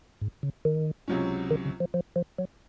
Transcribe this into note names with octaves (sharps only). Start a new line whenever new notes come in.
G#2
C#3
D#3
C#2 C3 F#3 C#4
D#3
C#3
F3
F3
F3
F#3